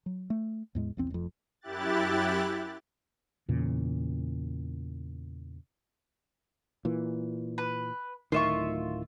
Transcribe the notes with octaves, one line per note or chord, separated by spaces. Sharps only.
F#3
A3
E2 A2 G#3
A#1 E2 C4
F1 F2
F#2 E4 G4 F#6 A6
E2 A#2 C#3
A#2 E3
B4
D1 A2 D#3 F4 E5 C#6